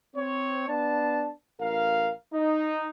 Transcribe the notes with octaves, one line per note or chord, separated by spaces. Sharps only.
C4 C#5
B3 D4 A5
A1 A#4 F5
D#4